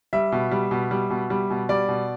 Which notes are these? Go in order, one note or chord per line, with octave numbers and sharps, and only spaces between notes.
G3 E5
B2
G3
B2
G3
B2
G3
B2
G3 D5
B2